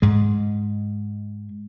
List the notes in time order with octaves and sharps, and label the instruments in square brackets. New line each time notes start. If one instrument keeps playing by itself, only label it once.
[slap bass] G#2 G#3